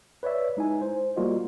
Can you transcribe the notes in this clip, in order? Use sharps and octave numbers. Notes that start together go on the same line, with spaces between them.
B4 C#5 D5 E5
G#3 D#4 E4 G#5
C5
G3 A#3 F4 F#4 D#5